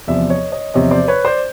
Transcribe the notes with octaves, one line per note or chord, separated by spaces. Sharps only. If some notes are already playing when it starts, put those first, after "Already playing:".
E2 C3 F3 D5 E5
C#5 D#5
C#5 D#5
E2 C3 F3 C#5 D#5
C5 D5
B4 C#5
C5 D5